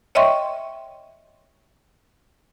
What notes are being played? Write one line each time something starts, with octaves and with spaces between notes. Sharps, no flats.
C#5 D#5 E5 G5 C6 C#6